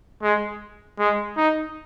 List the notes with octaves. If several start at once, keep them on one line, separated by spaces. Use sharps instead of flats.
G#3
G#3
D#4